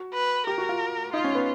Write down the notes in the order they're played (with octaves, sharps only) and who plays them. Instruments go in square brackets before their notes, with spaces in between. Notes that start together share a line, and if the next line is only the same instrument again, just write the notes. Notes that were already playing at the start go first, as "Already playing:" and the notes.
Already playing: [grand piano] F#4
[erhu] B4
[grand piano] G4 [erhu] A#4
[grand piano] F#4
F4
[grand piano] D#4 [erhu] F4
[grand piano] C#4
B3